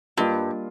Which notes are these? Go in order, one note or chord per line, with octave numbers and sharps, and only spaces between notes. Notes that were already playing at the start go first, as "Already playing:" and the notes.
G2 G3 A#3 F4 A#4 D#5